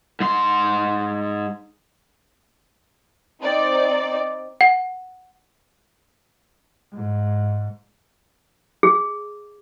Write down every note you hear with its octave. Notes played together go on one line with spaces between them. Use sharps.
G#2 C6
C4 D#4 D5
F#5
G#2
G#4